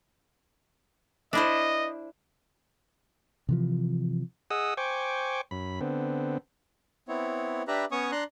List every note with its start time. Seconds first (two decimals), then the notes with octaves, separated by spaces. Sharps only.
1.33 D4 E4 C5 D#5
3.49 C3 E3 F3
4.51 G#4 D#5 F#5 D#6 E6
4.77 C5 G5 G#5 C#6 D6
5.51 F#2 B5
5.81 D3 B3 C4
7.08 B3 C4 E4 C#5
7.68 D4 G4 B4 E5 A#5 B5
7.91 B3 C#4 C#5 C#6 D#6
8.12 D4 A#5 C6 F#6